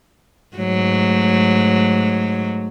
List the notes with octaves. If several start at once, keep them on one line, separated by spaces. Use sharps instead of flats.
G#2 F#3 A3